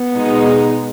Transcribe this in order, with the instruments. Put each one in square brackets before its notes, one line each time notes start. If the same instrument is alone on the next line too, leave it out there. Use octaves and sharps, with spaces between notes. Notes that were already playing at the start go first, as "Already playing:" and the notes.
Already playing: [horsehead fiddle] B3
[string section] B2 G#3 D#4